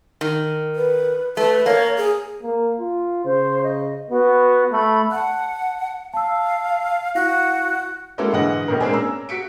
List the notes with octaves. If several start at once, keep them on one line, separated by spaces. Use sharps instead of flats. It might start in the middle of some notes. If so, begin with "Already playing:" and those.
D#3
B4
A3 B4
A#3 C#5
G#4
A#3
F4
C#3 C5
D#5
B3 F#4
A3 B5
F#5 A5 F#6
F5 A5 E6
E4 F#4 F5 A#6
G#3 A#3 C#4 E4 F#4 A4
G#2 D3 E3 D#5 F#5
B1 A2 A#4
G#3 A#3 C4 D4 G#4
C#4 A#5 E6
F#4 B6 C#7 D7